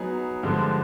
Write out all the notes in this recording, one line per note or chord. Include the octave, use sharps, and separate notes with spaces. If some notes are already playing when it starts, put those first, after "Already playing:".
Already playing: F#3 B3 D#4 G#4
G2 D3 F3 G#3